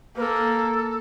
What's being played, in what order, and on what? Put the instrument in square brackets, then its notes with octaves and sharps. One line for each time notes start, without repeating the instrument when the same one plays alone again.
[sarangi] A#3 [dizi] A4 B4